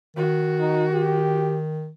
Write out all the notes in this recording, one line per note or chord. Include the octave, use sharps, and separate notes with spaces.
D#3 F#4
D#4
G4